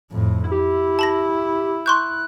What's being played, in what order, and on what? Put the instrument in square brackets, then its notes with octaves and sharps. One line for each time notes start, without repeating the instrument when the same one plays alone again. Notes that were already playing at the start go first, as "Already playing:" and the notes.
[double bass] F2 A2
[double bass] E4 [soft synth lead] G4
[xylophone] A5 B5 A#6
[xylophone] C6 C#6 G6 [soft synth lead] F#6